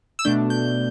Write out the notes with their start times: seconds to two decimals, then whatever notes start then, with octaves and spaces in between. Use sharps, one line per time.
0.19 E6
0.25 B2 A3 D4 G6
0.50 G6